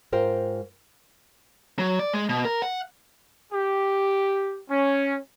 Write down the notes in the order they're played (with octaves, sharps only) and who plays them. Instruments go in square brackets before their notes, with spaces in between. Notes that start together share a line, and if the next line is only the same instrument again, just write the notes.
[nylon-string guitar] G#2 F4 A#4 C5 G5
[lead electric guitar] F#3
D5
G#3
B2
A#4
F#5
[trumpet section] G4
C#4